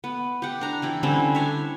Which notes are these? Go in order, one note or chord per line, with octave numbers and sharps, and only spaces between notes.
B3
G4 F#5
D4 A#5
E3 E4 G4
D3 G3 C4 C#4
D4 C#5 E5